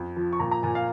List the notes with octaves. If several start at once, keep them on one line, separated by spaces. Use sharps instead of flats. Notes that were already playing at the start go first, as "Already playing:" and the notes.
Already playing: F2
F3
C#6
A#2 A#5
A#5
A#2 G#5
F5